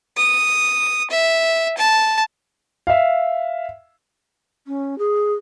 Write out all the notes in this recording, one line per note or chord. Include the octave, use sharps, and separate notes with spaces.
D#6
E5
A5
E5 F5
C#4
G#4